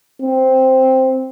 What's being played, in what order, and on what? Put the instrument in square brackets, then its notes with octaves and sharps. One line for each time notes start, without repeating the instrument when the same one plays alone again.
[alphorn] C4